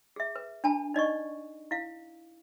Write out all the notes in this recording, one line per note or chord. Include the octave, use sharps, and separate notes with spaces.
G#4 E5
B4
D4 G#5 A5 B5
D#4 D5 D#5 C#6
E4 F5